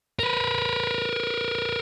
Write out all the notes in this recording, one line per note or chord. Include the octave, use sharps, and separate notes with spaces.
A#4 B4